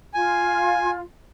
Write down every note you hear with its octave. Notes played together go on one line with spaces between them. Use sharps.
F4 G#5